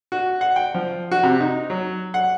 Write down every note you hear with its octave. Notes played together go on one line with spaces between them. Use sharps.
F#4
F#5
G5
F3
F#4
C3
D#4
F#3
F#5